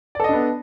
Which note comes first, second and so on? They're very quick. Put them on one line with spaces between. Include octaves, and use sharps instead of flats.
D5 A4 D#5 D4 B3